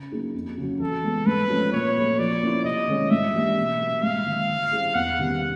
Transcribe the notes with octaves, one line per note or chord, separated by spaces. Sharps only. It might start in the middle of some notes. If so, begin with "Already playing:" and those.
Already playing: C#3
F#3 A#3 D#4 G#4
F2
C#3 F#3
E3 A4
G#3 B3
G#2 B4
F3 A3 C#4
A#2 C#5
F#3 A3
F3 D5
A#3 C#4 E4
C3 D#5
D#3 G#3 C#4 F4
G#2 E5
E3 G3 A#3 D4
B2
F#3 A#3
G#2 F5
D#3 F#3
D3
G3 C4 E4 G#4
E2 F#5
C3 D#3 G3 B3